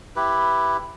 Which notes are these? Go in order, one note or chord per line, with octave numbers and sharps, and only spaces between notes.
E4 G4 B4